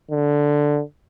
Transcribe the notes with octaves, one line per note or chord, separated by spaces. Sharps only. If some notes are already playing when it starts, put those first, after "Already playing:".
D3